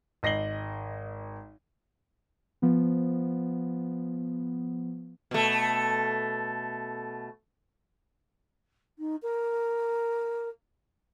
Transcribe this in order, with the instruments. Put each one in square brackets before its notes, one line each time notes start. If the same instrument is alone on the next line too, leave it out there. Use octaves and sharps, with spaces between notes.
[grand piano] G#1 D#5 A#6 C7 F#7 G7
[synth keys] F3 B3
[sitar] B2 A3
[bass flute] D#4
A#4